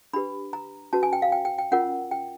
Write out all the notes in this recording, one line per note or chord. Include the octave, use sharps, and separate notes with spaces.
D4 G4 B4 B5
A#5
C#4 F#4 B4 A5
G#5
G5
F5
G5
G5
G5
C#4 F4 A#4 F#5
G5